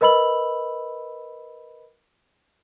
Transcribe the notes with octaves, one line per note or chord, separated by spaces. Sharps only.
A#4 B4 D#5 B5 E6 F#7